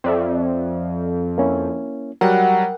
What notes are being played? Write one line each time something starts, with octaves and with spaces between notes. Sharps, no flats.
F2 C4 D5 E5
A#3 C#4 E4
F#3 G3 A#4 F#5 G5